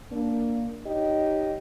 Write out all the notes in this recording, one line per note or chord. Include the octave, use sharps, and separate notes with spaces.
A#3 D4
D#4 G4 C#5 D#5